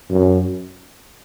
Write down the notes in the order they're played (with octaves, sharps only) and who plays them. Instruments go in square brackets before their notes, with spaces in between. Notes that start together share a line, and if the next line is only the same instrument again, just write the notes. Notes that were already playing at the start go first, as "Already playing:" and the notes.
[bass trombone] F#2